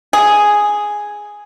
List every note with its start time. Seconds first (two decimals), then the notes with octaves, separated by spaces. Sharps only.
0.13 G#4